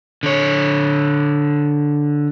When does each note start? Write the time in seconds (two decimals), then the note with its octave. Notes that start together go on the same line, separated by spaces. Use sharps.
0.23 D3 C#5